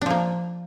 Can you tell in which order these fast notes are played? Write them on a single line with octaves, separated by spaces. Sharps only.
D4 F3 A#3